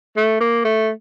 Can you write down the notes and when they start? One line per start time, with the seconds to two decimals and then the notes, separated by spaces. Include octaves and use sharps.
0.17 A3
0.41 A#3
0.65 A3